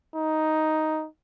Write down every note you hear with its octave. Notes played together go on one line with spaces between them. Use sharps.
D#4